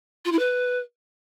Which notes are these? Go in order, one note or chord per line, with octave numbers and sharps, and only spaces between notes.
F4
E4
B4